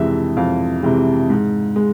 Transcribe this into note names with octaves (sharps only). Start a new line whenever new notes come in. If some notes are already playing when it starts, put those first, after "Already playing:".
Already playing: F2 C3 E3 G#3 E5
F2 F5
C3 E3 G#3
G#2
G#3